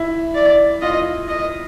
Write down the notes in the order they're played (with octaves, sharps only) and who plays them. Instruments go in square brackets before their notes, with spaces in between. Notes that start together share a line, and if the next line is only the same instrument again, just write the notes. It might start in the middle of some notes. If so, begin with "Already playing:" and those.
Already playing: [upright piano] E4
[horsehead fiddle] D5
[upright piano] F4 [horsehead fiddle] D#5
[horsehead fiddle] D#5